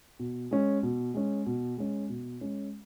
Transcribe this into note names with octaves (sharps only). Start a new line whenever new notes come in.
B2
G#3 C#4
B2
G#3 C#4
B2
G#3 C#4
B2
G#3 C#4